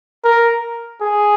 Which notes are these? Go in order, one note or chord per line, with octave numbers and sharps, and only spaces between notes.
A#4
G#4